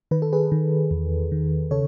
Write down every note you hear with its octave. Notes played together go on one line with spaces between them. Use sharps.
D#3 B4
A4
G#4 B4
D#3
E2
D#3
C#3 A4 C#5